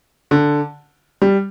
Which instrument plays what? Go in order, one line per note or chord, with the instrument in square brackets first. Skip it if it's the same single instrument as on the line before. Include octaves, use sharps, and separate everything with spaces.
[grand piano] D3
G3